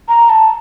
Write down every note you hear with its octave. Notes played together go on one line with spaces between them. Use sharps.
A#5
A5